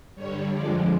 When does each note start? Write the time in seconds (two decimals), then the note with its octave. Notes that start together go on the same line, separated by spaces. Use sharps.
0.15 G2 D3 G3 C#5
0.53 F2 D3 F3 G#3 D5